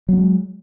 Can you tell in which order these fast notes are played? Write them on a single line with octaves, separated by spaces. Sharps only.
F#3 B3 G#3